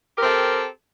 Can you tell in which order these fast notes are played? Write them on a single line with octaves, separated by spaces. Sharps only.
G4 A#4 C4 A4